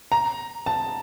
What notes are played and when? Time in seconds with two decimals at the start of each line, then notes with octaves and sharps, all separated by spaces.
0.12 A#5
0.66 A5